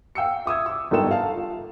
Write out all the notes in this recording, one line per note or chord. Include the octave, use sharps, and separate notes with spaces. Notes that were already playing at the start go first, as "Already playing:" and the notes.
F5 G5 E6 C#7
E5 D#6 E6 G#6
D6 E6
G1 G#2 G3 A4 G5 E7
F5 A5
F4